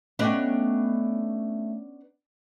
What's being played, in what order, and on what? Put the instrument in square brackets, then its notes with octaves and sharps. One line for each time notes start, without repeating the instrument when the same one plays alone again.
[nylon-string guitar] A3 D#5 G5 [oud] B3 C#4 D4